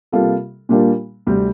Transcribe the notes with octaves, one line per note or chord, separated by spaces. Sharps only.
C3 G3 A#3 F4 A4
A#2 G3 A#3 D4 F4
D2 C3 G3 C4